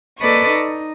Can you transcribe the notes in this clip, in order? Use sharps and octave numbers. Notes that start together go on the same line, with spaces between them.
A#3 A4 B4 D5 D#5 C#6
D#4